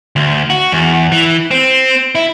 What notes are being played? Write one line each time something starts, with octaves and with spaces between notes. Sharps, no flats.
D2
F#4
E2
E3
C4
E4